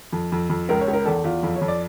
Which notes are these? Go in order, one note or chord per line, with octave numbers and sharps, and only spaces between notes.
F2
F2
F2
C#2 A#4
C#5
C#2
A#4
E2 A4
E2 F4
F2 F4
C#5
F2
D5